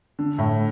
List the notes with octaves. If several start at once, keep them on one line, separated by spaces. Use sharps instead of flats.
D3
A2